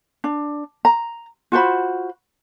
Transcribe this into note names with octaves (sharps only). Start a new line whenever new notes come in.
D4
A#5
F4 F#4 C5 B5